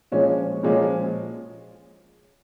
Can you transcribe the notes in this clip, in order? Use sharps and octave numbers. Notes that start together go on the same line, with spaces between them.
A#2 F3 G#3 C#4
A#2 F3 G#3 C#4